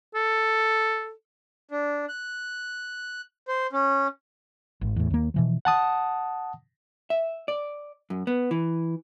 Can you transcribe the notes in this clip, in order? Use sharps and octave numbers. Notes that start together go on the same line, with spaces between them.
A4
D4
F#6
C5
C#4
G#1
E2 A2
D#2 A#3
B2 E3 F3
F#5 A5 D#6
E5
D5
F#2
B3
E3